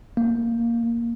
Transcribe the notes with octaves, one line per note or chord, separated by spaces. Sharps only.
A#3